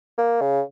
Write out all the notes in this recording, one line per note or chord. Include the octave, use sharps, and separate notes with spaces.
A#3
C#3